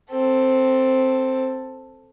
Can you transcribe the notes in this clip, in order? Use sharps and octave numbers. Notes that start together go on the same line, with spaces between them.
C4 A4